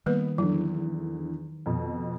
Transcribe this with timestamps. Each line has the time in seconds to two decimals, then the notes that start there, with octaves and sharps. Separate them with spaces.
0.06 D#3 G3 A#3 B3 B4
0.38 E2 D3 F#3
1.66 F2 B2